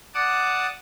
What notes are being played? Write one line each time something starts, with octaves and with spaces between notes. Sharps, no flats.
D5 F#5 A5 D6 D#6